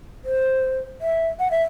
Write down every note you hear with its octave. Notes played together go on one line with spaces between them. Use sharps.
C5
E5
F#5
E5